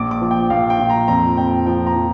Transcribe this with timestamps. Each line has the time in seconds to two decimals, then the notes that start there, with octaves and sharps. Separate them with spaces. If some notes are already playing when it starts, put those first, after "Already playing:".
Already playing: A#1 D6
0.11 D6
0.21 F3
0.31 G5
0.50 A#1 F5
0.70 G5
0.79 A#2
0.90 A#5
1.08 F2 A#5
1.37 F2 G5
1.66 F3 G5
1.87 A#5
1.96 F3